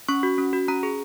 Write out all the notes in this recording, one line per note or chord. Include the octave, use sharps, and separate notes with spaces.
C#4 C#6
F#4
C#4
F#4
C#4 A#5
G#4